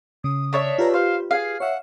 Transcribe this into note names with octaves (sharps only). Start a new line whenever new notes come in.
C#3 D#6
D4 C#5 E5
F4 G4 B4 A#5
C5 F5
G#4 F5
C#5 E5 F#5